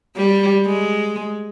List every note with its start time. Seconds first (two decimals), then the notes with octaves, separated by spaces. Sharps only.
0.16 G3
0.66 G#3